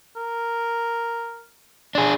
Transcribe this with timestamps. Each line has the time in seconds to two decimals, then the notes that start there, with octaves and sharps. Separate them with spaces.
0.16 A#4
1.95 D4 G#4